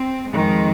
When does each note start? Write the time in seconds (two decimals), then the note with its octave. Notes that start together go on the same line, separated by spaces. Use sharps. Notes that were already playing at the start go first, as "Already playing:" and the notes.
Already playing: C4
0.29 F2 D#3 G#3